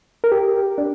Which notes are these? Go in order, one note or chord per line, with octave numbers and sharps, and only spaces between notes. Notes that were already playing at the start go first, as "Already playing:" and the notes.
A#4
G4
D4